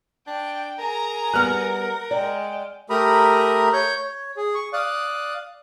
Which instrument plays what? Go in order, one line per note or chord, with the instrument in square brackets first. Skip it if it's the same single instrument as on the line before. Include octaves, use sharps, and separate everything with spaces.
[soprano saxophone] D4 [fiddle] G5
[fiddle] G#4 A#5 [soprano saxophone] A#4
[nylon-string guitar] G3 B3 [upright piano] F#5 F6 F#6
[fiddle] G#3 G5 [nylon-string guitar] D5
[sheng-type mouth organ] A3 G4 A#4 A#5 B5 D#6
C#5 C#6 G6
C#5
G#4
C#6
D5 F5 D#6 F#6